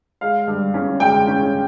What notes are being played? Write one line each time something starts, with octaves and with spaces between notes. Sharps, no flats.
G#3 F5
G2
C#4
G#3 G5
C#4